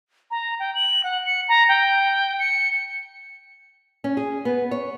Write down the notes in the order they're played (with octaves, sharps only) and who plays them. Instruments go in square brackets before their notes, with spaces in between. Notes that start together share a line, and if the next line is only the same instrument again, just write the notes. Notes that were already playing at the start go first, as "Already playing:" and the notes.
[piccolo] A#5
G5
F#7
F#5
C#7
A#5
G5
C#7
[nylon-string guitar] C#4
G#4
B3
C#5